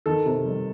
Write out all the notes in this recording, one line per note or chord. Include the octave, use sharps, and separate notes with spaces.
D#3 A4
C3
G3